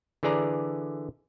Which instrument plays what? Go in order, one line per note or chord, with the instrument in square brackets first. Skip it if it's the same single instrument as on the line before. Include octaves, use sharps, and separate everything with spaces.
[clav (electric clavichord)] D3 E3 G#4 D5 A#5